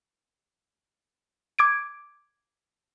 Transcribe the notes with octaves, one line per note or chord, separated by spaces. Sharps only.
D6 G#6 D7